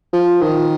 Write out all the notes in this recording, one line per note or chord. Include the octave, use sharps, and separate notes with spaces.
F3
D#3